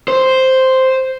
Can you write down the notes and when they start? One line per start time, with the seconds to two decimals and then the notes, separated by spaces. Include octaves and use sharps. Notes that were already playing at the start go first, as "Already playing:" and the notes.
0.08 C5